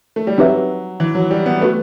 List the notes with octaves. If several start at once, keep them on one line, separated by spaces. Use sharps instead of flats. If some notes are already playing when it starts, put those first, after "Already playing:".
A3
G3
F#3 C4 D#4 G4 B4 E5
E3
F#3
G3
B3
A3 F#4 B4 F#5